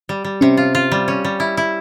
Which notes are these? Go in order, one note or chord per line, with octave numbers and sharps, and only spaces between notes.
G3
G3
C3 C#4
F4
F4
G3
C#4
G3
E4
E4